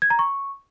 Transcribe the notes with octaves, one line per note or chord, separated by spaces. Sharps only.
G#6
A#5
C#6